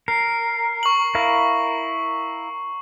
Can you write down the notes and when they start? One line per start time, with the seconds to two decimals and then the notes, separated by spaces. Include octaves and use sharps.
0.08 A#4 C7
0.83 C#6 F#7
1.15 E4 A#4 F5